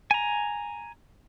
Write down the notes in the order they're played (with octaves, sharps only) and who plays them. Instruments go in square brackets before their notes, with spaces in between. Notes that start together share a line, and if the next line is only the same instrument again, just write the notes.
[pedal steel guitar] G#5 A#5